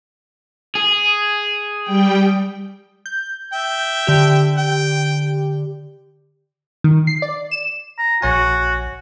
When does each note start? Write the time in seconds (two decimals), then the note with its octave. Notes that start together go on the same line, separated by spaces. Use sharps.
0.75 G#4
1.83 G3 G5
3.06 G6
3.53 E5 G5
4.07 D3 G4
4.57 G5
6.84 D#3
7.07 C7
7.22 D5
7.51 E7
7.98 A#5
8.22 A#1 F#4 C#5 G#5